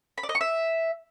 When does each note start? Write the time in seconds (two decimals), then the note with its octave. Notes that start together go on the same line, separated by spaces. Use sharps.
0.18 B5
0.23 D5
0.29 D#5
0.35 C#6
0.41 E5